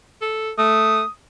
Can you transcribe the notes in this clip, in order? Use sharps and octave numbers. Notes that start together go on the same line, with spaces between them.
A4
A3 D#6